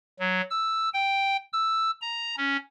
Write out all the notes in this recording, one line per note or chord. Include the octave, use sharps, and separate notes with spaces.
F#3
E6
G5
E6
A#5
C#4